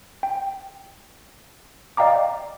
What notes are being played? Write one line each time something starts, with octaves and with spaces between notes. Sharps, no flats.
G5
D5 D#5 F5 G5 A#5 D6